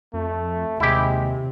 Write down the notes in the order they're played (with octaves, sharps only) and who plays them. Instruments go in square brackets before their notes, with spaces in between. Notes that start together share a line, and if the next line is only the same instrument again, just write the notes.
[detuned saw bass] F2 [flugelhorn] A3
[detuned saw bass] D#2 [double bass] C3 [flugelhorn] G#3 [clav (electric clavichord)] E4 G4